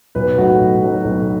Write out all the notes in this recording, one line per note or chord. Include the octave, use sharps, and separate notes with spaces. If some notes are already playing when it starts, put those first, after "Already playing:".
B1 B4
A2 F#3 A3 D#4 F#4
B1
A2 F#3 A3 D#4
B1